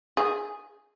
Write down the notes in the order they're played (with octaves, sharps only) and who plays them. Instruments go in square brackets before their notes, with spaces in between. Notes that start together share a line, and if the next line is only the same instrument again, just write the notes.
[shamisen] G#4